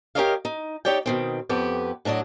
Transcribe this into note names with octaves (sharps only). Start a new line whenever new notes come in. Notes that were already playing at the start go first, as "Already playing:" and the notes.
G4 A4 A#4 C#5 D#5 F5
D#4
D#4 G4 C#5 D5 G5
B2 D#3 C4
F2 B3 G4
A2 F#3 D4 F#4 D#5